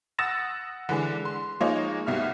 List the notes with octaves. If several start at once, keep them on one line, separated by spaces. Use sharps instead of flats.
F#5 D#6 E6 A6 A#6 E7
D3 E3 G#3 D4
C6
F3 G#3 A#3 D#4 C#5 D#5
C2 B2 E5 F6